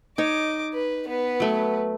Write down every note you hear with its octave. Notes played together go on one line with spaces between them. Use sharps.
D#4 C#5 D#5 D6
B4
B3 B4
F#3 A3